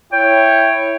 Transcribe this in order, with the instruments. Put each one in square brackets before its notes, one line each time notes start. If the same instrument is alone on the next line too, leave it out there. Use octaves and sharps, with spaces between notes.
[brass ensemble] E4 C#5 [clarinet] G5